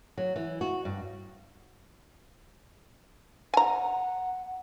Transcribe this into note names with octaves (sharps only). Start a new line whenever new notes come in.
F#3
E3
F#4
G2
F#5 G#5 A#5